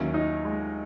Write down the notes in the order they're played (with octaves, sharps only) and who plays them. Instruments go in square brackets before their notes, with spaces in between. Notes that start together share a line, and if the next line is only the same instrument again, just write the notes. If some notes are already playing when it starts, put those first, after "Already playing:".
Already playing: [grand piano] D#2 D#3 F#3 C#4 E4
[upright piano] D#4
G#3